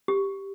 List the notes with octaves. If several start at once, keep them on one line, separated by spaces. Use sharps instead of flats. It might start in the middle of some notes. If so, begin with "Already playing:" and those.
G4